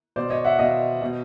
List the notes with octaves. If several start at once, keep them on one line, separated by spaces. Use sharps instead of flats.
B2 C5 D5
C#5 D#5
E5 F#5
B2 D#5 F5
B2